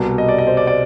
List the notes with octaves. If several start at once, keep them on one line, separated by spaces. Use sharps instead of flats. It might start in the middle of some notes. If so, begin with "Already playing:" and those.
Already playing: C2 B2 G3
D#5
D5
D#5
C5
D5
D5